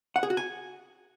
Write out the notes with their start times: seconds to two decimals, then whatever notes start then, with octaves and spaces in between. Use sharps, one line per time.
0.16 F#5
0.23 G#4
0.30 F#4
0.37 G#5